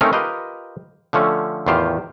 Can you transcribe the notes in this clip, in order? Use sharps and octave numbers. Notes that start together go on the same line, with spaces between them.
A3 C4 C#4 D#4 A#4
F4 G4 A#4 B4 D#5
D3 F3 A3 C#4
E2 A2 D#3 F4 G4 C5